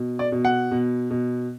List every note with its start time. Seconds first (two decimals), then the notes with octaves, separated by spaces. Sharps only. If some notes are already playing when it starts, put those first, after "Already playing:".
Already playing: B2
0.19 D5
0.32 B2
0.45 F#5
0.71 B2
1.11 B2